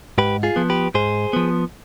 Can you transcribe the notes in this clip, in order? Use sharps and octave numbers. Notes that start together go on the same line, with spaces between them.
G#2 G4 B4
F4 G#4
F3 B3
G4 B4
G#2 G#4 C5
F3 B3